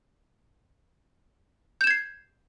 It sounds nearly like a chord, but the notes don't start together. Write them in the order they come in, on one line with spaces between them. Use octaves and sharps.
G6 E7 G#6 C7